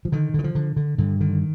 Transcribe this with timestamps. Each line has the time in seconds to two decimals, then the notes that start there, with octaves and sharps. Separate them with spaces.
0.05 F3
0.12 D3 D#3
0.34 D3 D#3
0.44 F3
0.55 D3
0.76 D3
0.98 G2 D3
1.20 D3 D#3